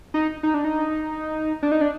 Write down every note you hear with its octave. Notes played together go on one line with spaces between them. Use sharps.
D#4
D#4
D4
D#4
D4
D#4
D4